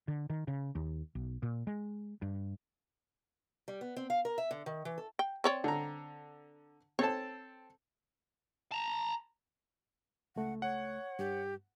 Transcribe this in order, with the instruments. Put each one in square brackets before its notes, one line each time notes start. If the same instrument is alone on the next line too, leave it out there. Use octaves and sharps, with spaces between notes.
[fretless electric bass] D3
D#3
C#3
D#2
B1
A#2
G#3
G2
[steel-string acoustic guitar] G3
B3
C4
F5
A#4
E5
D3
D#3
E3
A4
[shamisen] G5
C4 C#5 D5
[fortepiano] D3 A#5
[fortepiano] C4 A4 A5 [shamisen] C#5
[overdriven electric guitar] A5 A#5
[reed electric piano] C#2 A3 [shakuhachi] F#5
[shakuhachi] C#5 [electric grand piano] F#5
[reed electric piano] G2 [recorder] G4